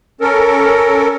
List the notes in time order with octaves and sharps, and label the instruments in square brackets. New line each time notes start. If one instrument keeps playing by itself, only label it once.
[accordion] C#4 A4 A#4